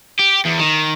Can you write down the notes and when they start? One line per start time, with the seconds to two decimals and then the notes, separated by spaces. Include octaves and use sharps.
0.20 G4
0.46 E2
0.60 D#3